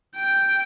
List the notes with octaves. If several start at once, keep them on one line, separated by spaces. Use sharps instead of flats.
G5